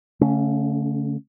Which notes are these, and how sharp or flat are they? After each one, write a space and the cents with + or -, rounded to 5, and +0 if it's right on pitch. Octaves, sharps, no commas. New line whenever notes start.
D3 -45 A3 +0 C#4 +0